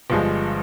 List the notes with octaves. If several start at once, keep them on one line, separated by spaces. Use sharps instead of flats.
G1 G2 F3 G#3